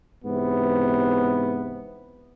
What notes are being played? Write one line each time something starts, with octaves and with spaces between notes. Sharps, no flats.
G#2 C3 E3 B3